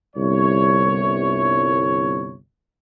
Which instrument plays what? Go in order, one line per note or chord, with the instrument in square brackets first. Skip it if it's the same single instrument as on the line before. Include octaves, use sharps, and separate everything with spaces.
[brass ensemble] G1 C2 C#5